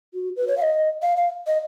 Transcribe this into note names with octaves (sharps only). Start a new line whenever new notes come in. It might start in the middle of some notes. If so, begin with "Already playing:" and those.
F#4
B4
C#5
F5
D#5
F5
F5
D#5